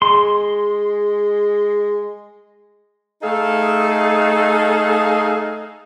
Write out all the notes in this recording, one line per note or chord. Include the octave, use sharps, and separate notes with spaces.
G#3 C6
A3 D#4 G#4 A4 F5